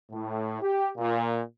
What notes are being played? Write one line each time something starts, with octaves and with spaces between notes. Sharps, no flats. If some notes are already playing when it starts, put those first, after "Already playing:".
A2
G4
A#2